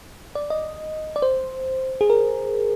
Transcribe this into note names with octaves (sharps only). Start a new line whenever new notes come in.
D5
D#5
D5
C5
G#4
A#4